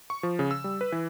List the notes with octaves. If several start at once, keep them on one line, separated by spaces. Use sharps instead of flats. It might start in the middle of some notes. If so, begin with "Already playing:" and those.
C#6
F3
C#3
E6
G3
B4
E3